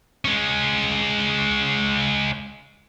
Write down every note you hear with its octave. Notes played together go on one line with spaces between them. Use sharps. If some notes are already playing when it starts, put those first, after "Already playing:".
G#3 C#4